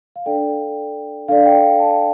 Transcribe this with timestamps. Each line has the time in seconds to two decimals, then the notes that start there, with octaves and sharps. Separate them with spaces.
0.16 F5
0.26 D4 A4 D5 G5
1.28 D4 A4 D5 F5
1.46 G5
1.62 G5
1.79 A5